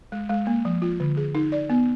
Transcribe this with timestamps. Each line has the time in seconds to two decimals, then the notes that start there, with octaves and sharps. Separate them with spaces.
0.12 G#3
0.29 G#3
0.47 A#3
0.65 F3
0.82 F4
1.00 D3
1.17 G#4
1.35 D#4
1.52 D5
1.70 B3